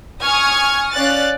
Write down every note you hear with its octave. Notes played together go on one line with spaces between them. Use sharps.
G#5 C#6 D#6 F6 G#6
C#4 D5 F5 F#6 A6